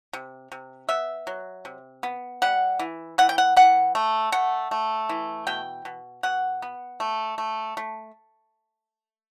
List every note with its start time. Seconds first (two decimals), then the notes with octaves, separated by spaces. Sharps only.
0.13 C3
0.52 C3
0.89 B3 E5
1.27 F#3
1.65 C3
2.03 B3
2.42 G3 F#5
2.79 E3
3.18 E3 F#5
3.29 G5
3.38 F#5
3.57 E3 F#5
3.95 A3
4.32 A3 F#5
4.71 A3
5.09 E3
5.47 B2 G5
5.85 B2
6.23 B2 F#5
6.62 B3
7.00 A3
7.38 A3
7.77 A3